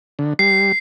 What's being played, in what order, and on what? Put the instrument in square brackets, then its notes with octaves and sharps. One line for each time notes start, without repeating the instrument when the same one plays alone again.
[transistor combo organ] D3
[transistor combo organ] G3 [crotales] C7